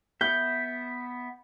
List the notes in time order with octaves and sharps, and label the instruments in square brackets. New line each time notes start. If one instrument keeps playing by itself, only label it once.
[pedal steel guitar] B3 E5 [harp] G6